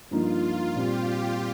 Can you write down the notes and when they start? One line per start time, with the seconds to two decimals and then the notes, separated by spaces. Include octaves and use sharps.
0.11 G2 F3 A#3 D#4 F4
0.75 A#2 G3 C4 G4